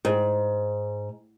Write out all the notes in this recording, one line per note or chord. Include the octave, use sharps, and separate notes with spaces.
G#2